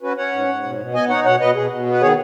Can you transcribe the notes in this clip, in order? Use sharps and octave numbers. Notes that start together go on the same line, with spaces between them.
C#4 F#4 B4
C#4 C#5 F#5
G#2
G#2
B2
B2
B3 D#5 G#5
D#4 C#5 F#5
B2 C#5 F#5
B2 B4 D#5
B2 G#4
B2
B3
B4
D#3 G#4 C#5